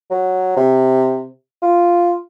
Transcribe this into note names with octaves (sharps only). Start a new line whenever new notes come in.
F#3
C3
F4